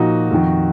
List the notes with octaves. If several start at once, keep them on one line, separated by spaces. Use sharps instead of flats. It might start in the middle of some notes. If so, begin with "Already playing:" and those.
Already playing: A#2 F3 D#4 F#4
F2 D#3